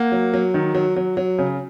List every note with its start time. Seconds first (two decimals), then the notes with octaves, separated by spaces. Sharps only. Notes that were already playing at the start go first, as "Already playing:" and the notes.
Already playing: A#3 F#5
0.12 F#3
0.34 F#3
0.54 D#3
0.74 F#3
0.96 F#3
1.17 F#3
1.39 C#3